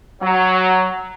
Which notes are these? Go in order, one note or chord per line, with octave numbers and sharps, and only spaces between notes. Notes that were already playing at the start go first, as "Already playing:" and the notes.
F#3